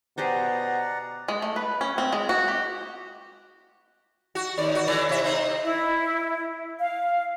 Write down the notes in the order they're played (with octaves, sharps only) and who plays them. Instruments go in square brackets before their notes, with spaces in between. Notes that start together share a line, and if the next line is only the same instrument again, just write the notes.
[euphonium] B2 [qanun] G4 G#4 C5 [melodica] D5 F#5 A#5
[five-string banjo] G#3
A3
B4
C#4
C4
G#3
F#4
G4
[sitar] F#4
D#2 D5
F#4
D3 E3 D5
C3 E5
C4 D#4
[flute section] E4
F5